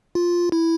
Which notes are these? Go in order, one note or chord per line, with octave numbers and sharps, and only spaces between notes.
F4
E4